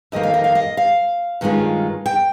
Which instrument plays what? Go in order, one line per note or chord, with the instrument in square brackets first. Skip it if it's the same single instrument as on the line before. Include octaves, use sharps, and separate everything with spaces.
[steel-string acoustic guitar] F2 D#3 A#3 D#5
F5
D#5
F5
D#5
F5
G2 D#3 G#3 C#4 F4
G5